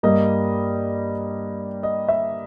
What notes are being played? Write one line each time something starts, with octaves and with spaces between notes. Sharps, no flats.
G2 G3 A#3 D#5
D#5
E5